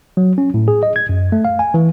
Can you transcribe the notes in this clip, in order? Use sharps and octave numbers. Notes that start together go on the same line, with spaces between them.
F#3
C#4
A2
G#4
D#5
G#6
F#2
A3
F5
G#5
E3